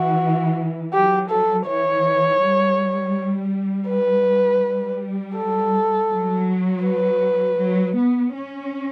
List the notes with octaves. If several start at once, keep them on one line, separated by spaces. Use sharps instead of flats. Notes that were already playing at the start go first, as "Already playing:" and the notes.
Already playing: E3 F#4
F#3 G4
A4
E3 C#5
G3
B4
G3
A4
F#3
B4
F#3
B3
C#4